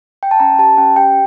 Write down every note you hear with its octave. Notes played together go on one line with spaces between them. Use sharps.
G5
A5
C#4 A#5
G4 A5
C#4 G5
G4 G5